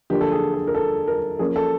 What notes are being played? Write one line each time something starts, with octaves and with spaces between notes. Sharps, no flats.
D3 F3 A#3 D4 G4
A4
G#4
A4
A#4
A4
A#4
F3 A#3 C#4 G#4
A4